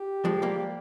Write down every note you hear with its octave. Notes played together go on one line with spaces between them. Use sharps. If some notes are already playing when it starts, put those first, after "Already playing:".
Already playing: G4
F3 G#3
G3 A#3